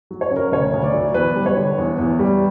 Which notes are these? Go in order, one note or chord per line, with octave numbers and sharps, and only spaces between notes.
F#3
C#5
C#3
A#4
D2 C#5
D2
D5
F#3
E2 B4
G3
C#5
D3
E2
E2
G3